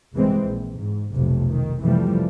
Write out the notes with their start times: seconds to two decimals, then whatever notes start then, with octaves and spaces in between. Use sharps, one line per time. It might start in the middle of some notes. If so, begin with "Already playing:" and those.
0.13 C2 E3 G#3 C4
0.44 A#1
0.78 G#2
1.13 F1 B1 C3
1.52 D#3
1.83 F2 C3 E3 F3 G3 A3